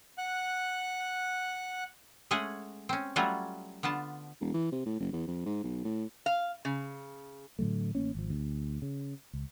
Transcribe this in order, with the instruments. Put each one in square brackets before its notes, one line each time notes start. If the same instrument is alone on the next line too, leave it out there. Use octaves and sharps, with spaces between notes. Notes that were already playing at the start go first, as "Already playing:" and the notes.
[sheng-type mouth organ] F#5 F#6
[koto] G#3 A3 C#4 G#4 F#5
C4 C#4
F#3 G3 A3 C#4 F4 F#4
D3 B3 F4 A5
[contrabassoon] E1
E3
C3
A2
F#1
E2
F2
G#2
B1
A2
[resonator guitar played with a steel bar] F5
C#3
[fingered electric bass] A2 D3 F#3 A3
A1 A#3 C#4
G#1 F3
D2
C#3
C#2